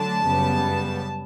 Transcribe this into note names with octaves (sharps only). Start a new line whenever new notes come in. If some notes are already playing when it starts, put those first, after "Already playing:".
Already playing: D3 F#3 A3 D4 A5
F#2 C#3 G3 B3